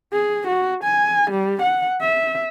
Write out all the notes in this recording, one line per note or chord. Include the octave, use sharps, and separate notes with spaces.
G#4
F#4
G#5
G3
F#5
E5